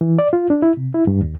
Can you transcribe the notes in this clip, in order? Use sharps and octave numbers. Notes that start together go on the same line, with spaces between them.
E3
D5
F4
D4
E4
C3
E4
G2
D#2